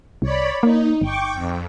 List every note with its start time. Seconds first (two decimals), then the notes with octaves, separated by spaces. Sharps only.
0.22 C2 C#5 D5 B5
0.63 A#3 D#4
1.01 G1 G5 C#6 D6
1.33 F2